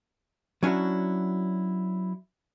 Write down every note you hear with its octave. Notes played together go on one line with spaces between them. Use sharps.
F#3 C#4 D4 E4 F#4